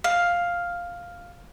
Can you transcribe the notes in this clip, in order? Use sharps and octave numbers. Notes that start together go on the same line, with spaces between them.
F5